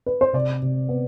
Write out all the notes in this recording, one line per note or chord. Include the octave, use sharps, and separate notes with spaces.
B4
C5
C3 D5
C3
B3